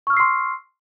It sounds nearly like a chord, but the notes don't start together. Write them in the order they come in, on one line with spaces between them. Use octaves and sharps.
C#6 F6 E6 C7 C6